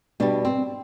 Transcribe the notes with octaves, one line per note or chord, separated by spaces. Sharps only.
B2 G3 D4
C4